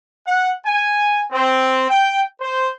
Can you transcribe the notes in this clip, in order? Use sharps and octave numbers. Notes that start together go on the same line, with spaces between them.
F#5
G#5
C4
G5
C5